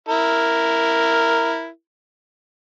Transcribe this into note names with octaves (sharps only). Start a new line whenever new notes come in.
E4 A#4